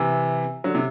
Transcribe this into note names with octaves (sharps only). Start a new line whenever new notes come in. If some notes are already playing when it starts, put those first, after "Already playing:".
Already playing: C3 E3
D3 F#3
C3